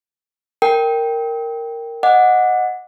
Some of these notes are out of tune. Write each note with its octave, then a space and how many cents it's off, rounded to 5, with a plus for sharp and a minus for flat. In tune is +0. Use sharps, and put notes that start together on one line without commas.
A#4 -10 G5 +0
D#5 +0 F#5 -15 D6 +0